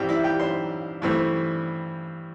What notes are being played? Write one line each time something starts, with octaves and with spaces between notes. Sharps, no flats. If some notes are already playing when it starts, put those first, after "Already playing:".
Already playing: G2 E3 G3 C4 G4 G5
E4 E5
G4 G5
C5 C6
G2 E3 A3 C4